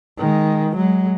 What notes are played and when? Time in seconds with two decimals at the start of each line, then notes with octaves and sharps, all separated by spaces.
0.18 D#3 G#3
0.76 F#3 G#3